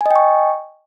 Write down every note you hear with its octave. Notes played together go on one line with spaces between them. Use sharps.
D#5 G5 G#5 C#6